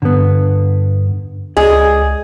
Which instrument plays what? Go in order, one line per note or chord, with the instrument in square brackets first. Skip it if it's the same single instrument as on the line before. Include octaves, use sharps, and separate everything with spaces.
[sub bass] G2 [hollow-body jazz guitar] D3 B3
[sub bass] C#2 [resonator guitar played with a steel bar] G#4 [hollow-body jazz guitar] D5 D#5